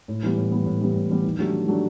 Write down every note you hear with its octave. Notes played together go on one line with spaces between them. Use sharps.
A2
E3 G3 B3
A2
E3 G3 B3
A2
E3 G3 B3
A2
E3 G3 B3
D#3
F#3 A3 D4 G4
D#3
F#3 A3 D4 G4